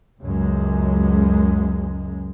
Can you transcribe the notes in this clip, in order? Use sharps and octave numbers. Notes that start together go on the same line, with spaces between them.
C#2 F#2 G#3